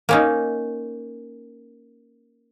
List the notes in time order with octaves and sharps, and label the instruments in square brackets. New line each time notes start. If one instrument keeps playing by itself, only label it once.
[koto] A#3 C#4 D#4